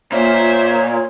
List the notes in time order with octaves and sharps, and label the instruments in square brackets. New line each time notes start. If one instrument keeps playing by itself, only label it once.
[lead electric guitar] A#2 [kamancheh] C5 E5 [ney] C#5